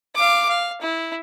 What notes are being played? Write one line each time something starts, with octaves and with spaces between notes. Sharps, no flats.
F5 D6
F5
E4